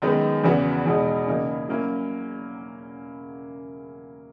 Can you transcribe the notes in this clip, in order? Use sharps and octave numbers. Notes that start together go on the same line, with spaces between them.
F#2 D#3 G#3 B3 D#4
E2 C#3 E3 B3 F#4
E2 B2 G#3 D#4
C#3 E3 A#3 D#4
F#3 A#3 C#4 E4